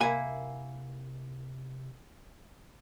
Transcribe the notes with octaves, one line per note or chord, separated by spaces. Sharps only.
C3 A#3 E4 F#5 G#5